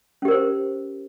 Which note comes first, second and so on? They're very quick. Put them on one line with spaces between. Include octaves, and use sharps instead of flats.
C#4 G4 A#4 C5